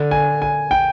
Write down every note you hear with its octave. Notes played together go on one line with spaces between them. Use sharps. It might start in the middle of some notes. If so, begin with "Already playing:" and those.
Already playing: D3
G#5
G#5
G5